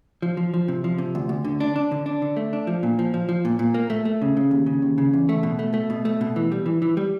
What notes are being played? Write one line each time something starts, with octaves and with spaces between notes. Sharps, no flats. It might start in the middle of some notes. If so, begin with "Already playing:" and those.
F3
F3
F3
C3
F3
C3
D2
D2
D3
D4
D4
D3
D4
D3
A3
D4
F3
A#2
F3
F3
F3
A#2
A#2
A#3
A3
A3
C#3
C#3
D#2
C#3
D#2
C#3
E2
A3
B2
A3
A3
B2
A3
B2
E3
G3
E3
E3
G3